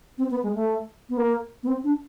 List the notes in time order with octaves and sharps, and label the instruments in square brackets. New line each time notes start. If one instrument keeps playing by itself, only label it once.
[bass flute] C4
B3
G#3
A3
B3
A#3
B3
C4
D4